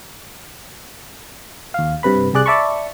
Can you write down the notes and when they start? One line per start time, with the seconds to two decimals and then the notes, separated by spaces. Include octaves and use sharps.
1.74 D#2 F5
2.03 G2 C3 B4 B5
2.33 C2 C3 G#4 D5 F#6
2.46 D5 E5 A5 B5 C#6